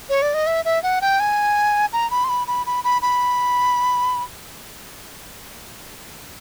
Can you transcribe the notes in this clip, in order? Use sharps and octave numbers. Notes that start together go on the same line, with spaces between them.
C#5
D5
D#5
E5
E5
F#5
G5
G#5
A#5
B5
C6
B5
B5
B5
B5
B5